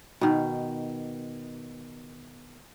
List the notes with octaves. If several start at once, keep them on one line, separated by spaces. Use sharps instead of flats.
B2 D#3